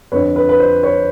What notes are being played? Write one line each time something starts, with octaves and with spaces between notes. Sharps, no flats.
F2 D3 F3 B4 C#5
B4
B4
C5
B4 C#5